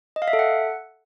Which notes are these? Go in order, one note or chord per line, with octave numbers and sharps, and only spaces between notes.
D#5
F5
E5
A4
F#5